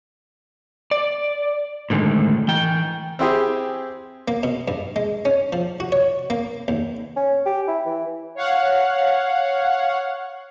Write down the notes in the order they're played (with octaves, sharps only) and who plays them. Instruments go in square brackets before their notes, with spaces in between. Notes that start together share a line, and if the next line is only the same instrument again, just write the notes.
[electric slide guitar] D5
A2 D3 D#3 G#3
E3 G5
[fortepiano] C4 E4 G4 G#4
[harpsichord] A#3
B2
G2
G#3
C#4
F3
F#4
C#5
A#3
D#2
[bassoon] C#4
G4
E4
E3
[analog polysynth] C#5 F5 F#5